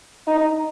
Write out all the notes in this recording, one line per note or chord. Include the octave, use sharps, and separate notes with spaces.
D#4